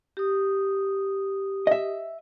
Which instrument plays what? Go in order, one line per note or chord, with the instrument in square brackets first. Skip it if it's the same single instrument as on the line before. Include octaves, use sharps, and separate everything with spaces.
[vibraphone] G4 D#6
[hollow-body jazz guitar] D#5 E5